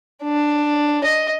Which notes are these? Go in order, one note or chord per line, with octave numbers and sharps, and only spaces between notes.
D4
D#5